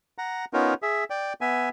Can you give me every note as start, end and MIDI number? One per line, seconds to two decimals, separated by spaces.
0.18 0.45 78
0.18 0.45 82
0.53 0.74 59
0.53 0.74 61
0.53 0.74 63
0.53 0.74 65
0.53 0.74 70
0.82 1.04 68
0.82 1.04 76
1.10 1.33 74
1.10 1.33 79
1.41 1.69 59
1.41 1.69 76
1.41 1.69 80